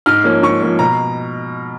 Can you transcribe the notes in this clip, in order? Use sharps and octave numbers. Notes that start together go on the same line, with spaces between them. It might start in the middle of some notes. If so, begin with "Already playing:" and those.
G#2 F6
F3 A#3 C#4
G#2 C#6
F3 A#3 C#4
B2 A#5